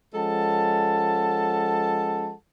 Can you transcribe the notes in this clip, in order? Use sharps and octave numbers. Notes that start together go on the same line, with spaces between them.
F3 G#3 C#4 A4 F#5 A5